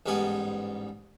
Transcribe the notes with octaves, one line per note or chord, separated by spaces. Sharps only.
A1 G#2 G3 B3 G#5